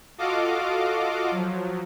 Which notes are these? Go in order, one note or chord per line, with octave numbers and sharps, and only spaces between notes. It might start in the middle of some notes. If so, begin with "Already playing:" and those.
F4 F#4 A4 D#5 F5 D6
F3 F#3